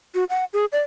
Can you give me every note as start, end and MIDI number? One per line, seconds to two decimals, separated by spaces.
0.15 0.24 66
0.30 0.44 78
0.53 0.65 68
0.72 0.80 74